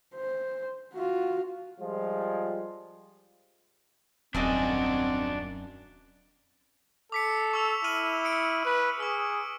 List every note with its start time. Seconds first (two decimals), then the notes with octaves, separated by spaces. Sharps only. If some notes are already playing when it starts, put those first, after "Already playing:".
0.15 C5
0.94 F4 F#4
1.80 F3 G3 G#3 F4
4.34 D#1 F#2 A#3 C4 D4 F#4 D#5
7.12 A4 D6 B6 C#7
7.53 C#6 E6 F7
7.84 E4 F6 D#7 F#7
8.24 D#6 C#7 D7
8.65 B4
9.00 G#4 C#6 E6